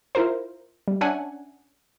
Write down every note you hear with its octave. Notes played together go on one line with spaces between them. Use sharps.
E4 F4 A#4 C5
G3
C#4 D4 E5 F#5 G#5 A5